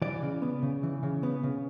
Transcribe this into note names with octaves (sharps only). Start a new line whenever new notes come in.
E3 D5
C#3
B3
C#3
E3
C#3
B3
C#3